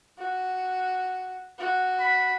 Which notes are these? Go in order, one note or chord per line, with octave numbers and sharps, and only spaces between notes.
F#4
F#4
B5